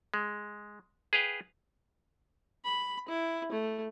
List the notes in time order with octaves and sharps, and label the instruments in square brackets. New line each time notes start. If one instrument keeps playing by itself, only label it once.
[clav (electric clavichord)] G#3
G#4 B4 F5 G5
[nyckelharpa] B5
E4
A3